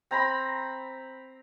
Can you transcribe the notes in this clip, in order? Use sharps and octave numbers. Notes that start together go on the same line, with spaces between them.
C4 A#5 B5